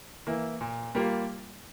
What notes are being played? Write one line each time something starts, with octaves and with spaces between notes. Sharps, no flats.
E3 A#3 E4
A#2
G3 A#3 F4